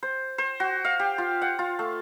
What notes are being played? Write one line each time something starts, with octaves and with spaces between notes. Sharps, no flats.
C5
C5
F#4
F5
G4
F4
F#5
F4
A3